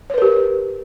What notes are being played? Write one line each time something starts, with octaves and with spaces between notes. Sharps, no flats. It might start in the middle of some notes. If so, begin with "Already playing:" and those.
G4 A#4 B4 C#5